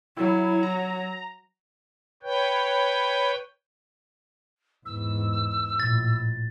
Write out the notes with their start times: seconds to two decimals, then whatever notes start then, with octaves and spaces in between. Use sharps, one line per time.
0.17 F#3 E4
0.63 A#5
2.23 B4 C#5 G5
4.86 E2 G#2 E6
5.80 A#1 A2 A6